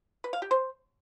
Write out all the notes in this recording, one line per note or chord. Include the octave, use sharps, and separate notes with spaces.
B4
F5
G4
C5